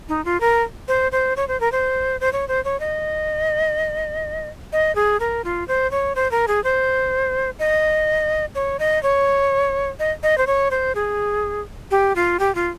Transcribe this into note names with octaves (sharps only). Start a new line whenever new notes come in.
D#4
F4
A#4
C5
C5
C#5
C5
A#4
C5
C5
C#5
C5
C#5
D#5
D#5
G#4
A#4
F4
C5
C#5
C5
A#4
G#4
C5
D#5
C#5
D#5
C#5
D#5
D#5
C5
C#5
C5
G#4
G4
F4
G4
F4